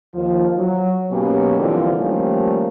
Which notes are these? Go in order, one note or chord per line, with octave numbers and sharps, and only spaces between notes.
D#2 F3
F#3
G#2 B2 F#3 A#3 C#4 G4
A#2 D3 E3 F3 G3 C4
D#3 F3 G3 A3 A#3 C#4